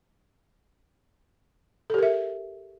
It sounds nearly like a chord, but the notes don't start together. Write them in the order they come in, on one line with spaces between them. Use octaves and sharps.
A4 G4 A#4 E5